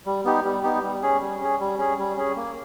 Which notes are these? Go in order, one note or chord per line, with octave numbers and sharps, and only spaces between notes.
G3
B3 D#4 G4
G3
B3 D#4 G4
G3
C#4 G#4
G3
C#4 G#4
G3
C#4 G#4
G3
C#4 G#4
A#3